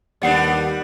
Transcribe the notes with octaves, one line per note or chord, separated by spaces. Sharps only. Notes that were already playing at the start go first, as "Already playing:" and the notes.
D#2 G3 B3 D4 D5 F#5 C7